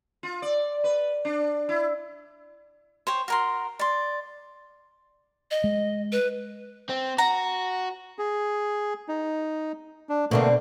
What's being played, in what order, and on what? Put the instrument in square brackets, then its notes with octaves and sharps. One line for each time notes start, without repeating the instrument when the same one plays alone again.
[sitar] F4
D5
B4
D4
E4
[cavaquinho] C5 C#5 G5
F#4 A#4 C6
D5 C6
[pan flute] D#5
[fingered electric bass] G#3
[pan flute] B4
[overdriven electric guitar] C4
[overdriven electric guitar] F#4 [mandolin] A#5
[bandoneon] G#4
D#4
D4
[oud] B2 C4 D4 [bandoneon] D3 A3 A#3